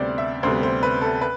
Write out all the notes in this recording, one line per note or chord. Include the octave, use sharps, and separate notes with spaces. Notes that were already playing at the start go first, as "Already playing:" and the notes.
Already playing: D2 C3 G3 B3 C5 D5
E5
D2 C3 G3 B3 C5
C5
B4
A4
B4